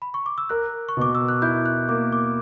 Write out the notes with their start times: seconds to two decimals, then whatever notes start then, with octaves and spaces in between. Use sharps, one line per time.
0.02 B5
0.14 C#6
0.26 D6
0.38 E6
0.49 A#4 F#6
0.89 C#6
0.97 B2 D6
1.15 E6
1.29 F#6
1.42 E4 G6
1.66 F#6
1.89 A#3 D6
2.12 D6